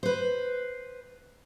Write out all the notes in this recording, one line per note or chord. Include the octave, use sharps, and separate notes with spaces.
B4 C5